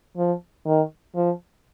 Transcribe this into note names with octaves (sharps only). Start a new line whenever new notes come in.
F3
D#3
F3